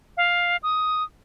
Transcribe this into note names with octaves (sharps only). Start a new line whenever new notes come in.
F5
D#6